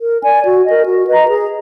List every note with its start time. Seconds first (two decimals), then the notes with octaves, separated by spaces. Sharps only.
0.01 A#4
0.23 D5 G#5
0.44 F#4
0.65 A#4 D#5
0.86 F#4
1.07 B4 D#5 A#5
1.29 G#4